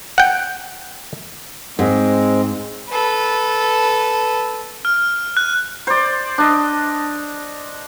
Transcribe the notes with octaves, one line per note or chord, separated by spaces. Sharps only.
F#5 G5
G#2 G#3 C4
A4 B4
F6
F#6
C5 D5
D4 D#5